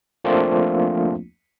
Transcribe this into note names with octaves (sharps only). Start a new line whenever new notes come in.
F3 A3 A#3 C4 D4 F4